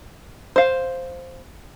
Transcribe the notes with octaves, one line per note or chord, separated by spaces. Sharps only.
C5 F5